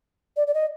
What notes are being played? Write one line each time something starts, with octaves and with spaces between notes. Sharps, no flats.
D5
D5
D#5